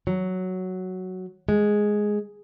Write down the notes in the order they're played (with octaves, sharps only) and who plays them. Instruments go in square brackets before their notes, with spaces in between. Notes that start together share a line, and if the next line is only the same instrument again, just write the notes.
[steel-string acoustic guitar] F#3
G#3